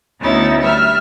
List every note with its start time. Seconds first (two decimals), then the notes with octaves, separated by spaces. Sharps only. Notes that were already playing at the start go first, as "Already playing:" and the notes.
0.20 D2 B3 C#4 D#4 E4 A6
0.59 G3 E5 F6